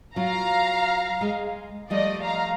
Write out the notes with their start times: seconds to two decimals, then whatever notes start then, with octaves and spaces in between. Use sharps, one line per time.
0.16 F#3 F4 F5 A#5
1.21 G#3
1.90 F3 G3 A3 D5 D#5
2.23 F5 A#5